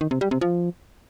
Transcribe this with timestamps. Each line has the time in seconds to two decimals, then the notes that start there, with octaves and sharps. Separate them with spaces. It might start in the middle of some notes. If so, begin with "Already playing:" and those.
0.01 D#3
0.11 C3
0.21 G3
0.31 C3
0.41 F3